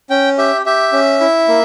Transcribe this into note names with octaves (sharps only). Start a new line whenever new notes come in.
C#4 G5
G4 E5
G4 E5
C#4
E4
A#3